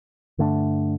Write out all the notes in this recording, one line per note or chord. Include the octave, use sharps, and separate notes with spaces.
G2 D3 A3 D4